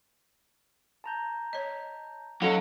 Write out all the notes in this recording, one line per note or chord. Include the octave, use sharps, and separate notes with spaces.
A5 A#5 G6
C#5 D#5
F#3 C#4 F4 F#4 A4 D#5 F5